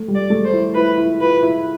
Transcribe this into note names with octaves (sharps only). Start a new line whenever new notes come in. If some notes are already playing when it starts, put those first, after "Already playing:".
Already playing: A3
G3
D5
A3
C5
E4
E4 B4
E4
F4 B4
E4